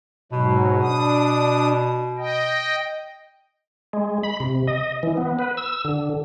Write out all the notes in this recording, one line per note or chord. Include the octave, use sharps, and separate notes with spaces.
G#2 B2 F#3
D4 D#6
D#5 G5
G#3
B5
C3
D#5
E3
B3
B4
E6
D3